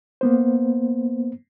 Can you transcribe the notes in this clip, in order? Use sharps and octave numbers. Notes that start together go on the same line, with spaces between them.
A#3 B3 C5